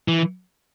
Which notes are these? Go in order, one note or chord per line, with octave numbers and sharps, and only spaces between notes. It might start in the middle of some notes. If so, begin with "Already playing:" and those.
E3